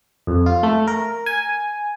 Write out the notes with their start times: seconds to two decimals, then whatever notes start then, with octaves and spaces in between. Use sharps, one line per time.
0.27 F2
0.46 F4
0.63 A3
0.87 A#4
1.26 G#5